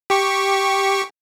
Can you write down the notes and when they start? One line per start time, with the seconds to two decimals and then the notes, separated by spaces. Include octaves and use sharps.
0.10 G4 C#6